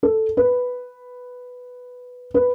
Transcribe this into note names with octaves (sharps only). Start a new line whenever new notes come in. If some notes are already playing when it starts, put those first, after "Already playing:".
A4
B4
B4